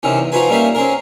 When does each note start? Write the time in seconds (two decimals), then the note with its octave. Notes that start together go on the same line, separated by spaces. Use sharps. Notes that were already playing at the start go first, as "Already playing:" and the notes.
0.03 C3 D#3 E3 C#4
0.17 E2
0.32 F3 D#4 F4 F#4 B4 G#5
0.49 G3 A#3 C#4 D#4 E5 F5
0.75 C4 C#4 G#4 A#4